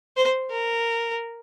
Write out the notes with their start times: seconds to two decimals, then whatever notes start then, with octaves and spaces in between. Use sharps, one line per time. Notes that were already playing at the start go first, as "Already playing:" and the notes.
0.17 C5
0.51 A#4